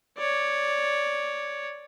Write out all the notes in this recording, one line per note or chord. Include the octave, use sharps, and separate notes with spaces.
C#5 D5